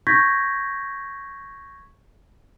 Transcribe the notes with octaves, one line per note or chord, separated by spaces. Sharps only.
C#6 G6 G#6 A#6 B6